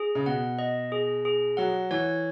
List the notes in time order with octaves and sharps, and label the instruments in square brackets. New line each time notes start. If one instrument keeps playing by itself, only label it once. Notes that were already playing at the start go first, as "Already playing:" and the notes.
Already playing: [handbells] G#4
[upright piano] C#3
[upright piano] B2 [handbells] F#5
[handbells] D#5
G#4
G#4
[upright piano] F#3 [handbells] F#5
[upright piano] E3 [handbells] C#5